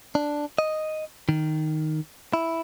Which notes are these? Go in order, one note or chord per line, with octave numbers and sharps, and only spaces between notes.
D4
D#5
D#3
E4